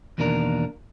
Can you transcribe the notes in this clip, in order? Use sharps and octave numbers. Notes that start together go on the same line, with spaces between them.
E2 B2 D#3 A#3 D4 A#4